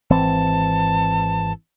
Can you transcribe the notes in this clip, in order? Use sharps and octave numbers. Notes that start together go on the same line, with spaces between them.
G#1 E3 C4 A5